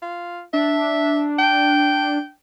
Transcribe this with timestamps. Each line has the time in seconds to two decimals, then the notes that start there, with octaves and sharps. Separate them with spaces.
0.02 F4
0.53 D4 E5
1.39 G5